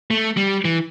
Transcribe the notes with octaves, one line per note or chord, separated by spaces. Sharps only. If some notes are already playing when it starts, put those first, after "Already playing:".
A3
G3
E3